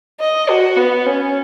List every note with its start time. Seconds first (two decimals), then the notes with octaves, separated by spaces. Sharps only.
0.21 D#5
0.49 F#4
0.77 B3
1.06 C#4